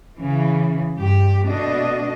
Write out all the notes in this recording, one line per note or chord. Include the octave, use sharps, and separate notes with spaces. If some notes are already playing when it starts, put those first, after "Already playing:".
C#3 E3
G2 G4
B2 A3 D4 D#5